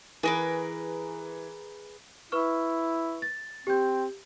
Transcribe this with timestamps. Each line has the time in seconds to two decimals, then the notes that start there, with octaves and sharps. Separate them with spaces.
0.23 E3 G#4 A#4 B4
2.32 E4 B4 C#6 F6
3.22 A6
3.67 C4 G4 G6